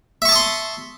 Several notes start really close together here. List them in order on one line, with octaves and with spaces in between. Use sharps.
E5 C#6 A5 D#6 C6